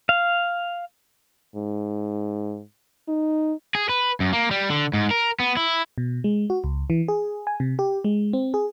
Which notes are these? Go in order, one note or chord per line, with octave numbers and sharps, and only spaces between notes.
F5
G#2
D#4
G#4
B4
F#2
A#3
G3
D3
G#2
A#4
B3
E4
B2
G#3
F#4
C#2
E3
G#4
G#5
C3
G4
G#3
C4
G#4